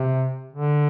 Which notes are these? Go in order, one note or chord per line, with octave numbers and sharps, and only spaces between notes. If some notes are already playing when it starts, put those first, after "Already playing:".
Already playing: C3
D3